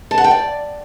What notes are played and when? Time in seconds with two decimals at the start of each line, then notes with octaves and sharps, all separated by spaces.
0.11 A5
0.18 F#5
0.24 G5
0.31 D5